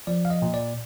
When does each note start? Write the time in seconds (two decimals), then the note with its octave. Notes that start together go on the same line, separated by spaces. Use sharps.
0.07 F3 D5
0.25 F5
0.30 D#5
0.42 A#2
0.54 D5